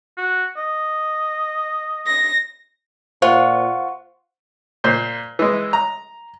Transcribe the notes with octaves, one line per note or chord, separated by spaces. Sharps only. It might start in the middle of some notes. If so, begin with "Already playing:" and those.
F#4
D#5
A#6
A#2 F4 C5 F#5 C6 C#6
A#2 C5
E3 G#3
A#5